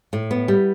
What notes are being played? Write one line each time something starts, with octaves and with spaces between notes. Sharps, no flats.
A2
B3
G3